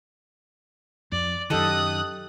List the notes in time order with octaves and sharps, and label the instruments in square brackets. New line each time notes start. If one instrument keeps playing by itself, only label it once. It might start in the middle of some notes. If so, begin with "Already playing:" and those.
[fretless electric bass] F2 [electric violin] D5
[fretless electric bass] F#2 D#3 [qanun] G4 A4 D#5 [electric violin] D#6 F#6